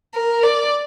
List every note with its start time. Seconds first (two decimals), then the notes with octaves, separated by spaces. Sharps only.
0.14 A#4
0.43 D5